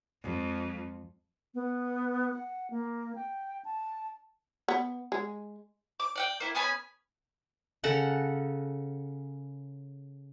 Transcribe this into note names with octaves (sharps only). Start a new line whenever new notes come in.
F2 G#3
B3
F#5
A#3
G5
A5
B3
G#3
D6
D5 F#5 G5
A#3 E4
B3 C#4 G#5 B5
C#3 A4 A#4 F#5